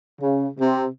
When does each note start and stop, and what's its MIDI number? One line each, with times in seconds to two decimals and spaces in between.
0.21 0.47 49
0.59 0.86 48